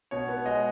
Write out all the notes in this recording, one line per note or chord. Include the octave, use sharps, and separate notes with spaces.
B2 C#5
B3
G#3 D#5